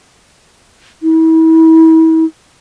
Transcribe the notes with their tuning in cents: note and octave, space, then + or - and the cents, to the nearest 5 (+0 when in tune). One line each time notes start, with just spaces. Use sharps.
E4 -35